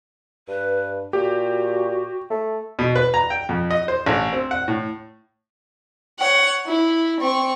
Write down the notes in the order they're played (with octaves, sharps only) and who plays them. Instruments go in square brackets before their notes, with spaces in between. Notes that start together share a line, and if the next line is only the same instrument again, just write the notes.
[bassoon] G2 [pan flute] B4
[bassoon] A#2 [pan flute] F#4 [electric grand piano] G4
[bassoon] A3
[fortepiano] B2
B4
A#5
G5
F2
D#5
C5
A1
C4
F#5
A2
[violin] C#5 F#5
E4
C4 C#6